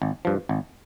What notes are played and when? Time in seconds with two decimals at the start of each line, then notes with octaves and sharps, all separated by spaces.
0.02 G#1
0.25 G2 F3
0.49 G#1